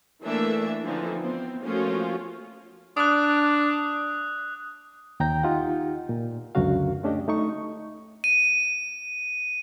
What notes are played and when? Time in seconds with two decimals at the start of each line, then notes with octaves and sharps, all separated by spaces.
0.23 E3 A3 A#3 D4 E5
0.83 D3 E3 F3 C4 D#4
1.22 B3 C4
1.64 F3 A3 A#3 C#4 F4 F#4
2.97 D4 D#6 F#6
5.20 D#2 G5 A#5 G6
5.43 D#4 F4 G4 F#5
6.09 A#2
6.55 C#2 F#2 D3 F#3 F#4 F5
7.03 A3 C#4 D4 G4 D#5
7.28 A3 D#4 C#6
8.24 D#7